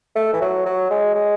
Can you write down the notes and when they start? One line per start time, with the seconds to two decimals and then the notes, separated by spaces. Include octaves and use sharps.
0.16 A3
0.33 E3
0.41 F#3
0.66 F#3
0.90 G#3
1.15 G#3